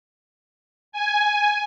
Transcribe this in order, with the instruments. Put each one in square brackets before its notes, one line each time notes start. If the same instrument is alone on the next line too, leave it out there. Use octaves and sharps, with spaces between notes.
[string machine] G#5